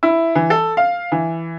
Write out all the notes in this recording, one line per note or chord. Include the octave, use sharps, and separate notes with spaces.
E4
E3
A4
F5
E3